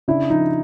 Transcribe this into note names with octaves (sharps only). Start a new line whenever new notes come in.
C#3 D4 E4
F3 D#4